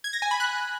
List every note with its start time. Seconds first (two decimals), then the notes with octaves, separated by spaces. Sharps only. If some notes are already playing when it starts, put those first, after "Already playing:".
0.04 G#6
0.13 A#6
0.22 G#5
0.31 B5
0.40 F#6